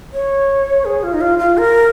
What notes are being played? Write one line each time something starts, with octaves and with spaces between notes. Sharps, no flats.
C#5
G#4
F4
D#4
F4
F4
A#4